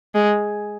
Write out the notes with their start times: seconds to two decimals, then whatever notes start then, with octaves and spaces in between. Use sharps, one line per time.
0.15 G#3